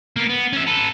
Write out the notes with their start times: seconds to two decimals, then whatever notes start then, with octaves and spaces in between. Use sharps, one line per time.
0.16 A#3 B3
0.29 B3
0.53 C#4 E5
0.67 A4 B4